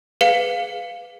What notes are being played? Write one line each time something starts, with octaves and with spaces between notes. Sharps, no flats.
G#4 B4 F5 C#7